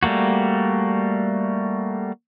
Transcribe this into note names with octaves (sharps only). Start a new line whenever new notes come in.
G3 A3 A#3 F#4